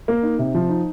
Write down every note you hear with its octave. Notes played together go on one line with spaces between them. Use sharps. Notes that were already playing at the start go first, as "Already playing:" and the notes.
A#3
D#4
C3
F3
D#4